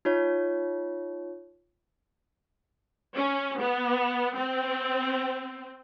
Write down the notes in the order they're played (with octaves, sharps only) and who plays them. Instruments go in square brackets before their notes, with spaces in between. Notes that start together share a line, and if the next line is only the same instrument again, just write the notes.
[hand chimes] D#4 F4 C#5
[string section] C#4
B3
C4